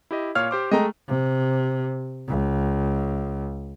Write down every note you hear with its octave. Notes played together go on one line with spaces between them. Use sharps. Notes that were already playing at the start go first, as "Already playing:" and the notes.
E4 G4 D#5
A#2 C#5 F5 F6
G4 C5 D6
G#3 A3 D#5 G5 A#5
C3
C#2